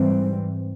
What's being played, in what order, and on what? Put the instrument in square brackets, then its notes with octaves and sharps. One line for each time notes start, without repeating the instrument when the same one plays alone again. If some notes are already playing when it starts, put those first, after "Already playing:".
Already playing: [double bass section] G#2 E3 G3 C4